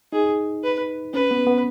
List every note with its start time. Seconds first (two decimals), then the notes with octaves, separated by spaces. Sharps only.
0.13 D#4 G#4
0.64 B4
1.14 C#4 B4
1.31 B3
1.47 B3